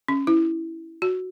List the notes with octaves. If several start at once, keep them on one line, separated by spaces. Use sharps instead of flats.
C#4
E4
F#4